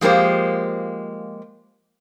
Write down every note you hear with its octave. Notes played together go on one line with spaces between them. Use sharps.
F3 G#3 A#3 G4 C5